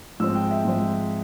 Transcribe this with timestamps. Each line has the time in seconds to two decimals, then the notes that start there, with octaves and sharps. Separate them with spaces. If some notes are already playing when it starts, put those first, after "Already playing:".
0.20 G#2 F3 G#3 C4 E6
0.35 G5
0.51 E5
0.65 G#2 F3 G#3 C4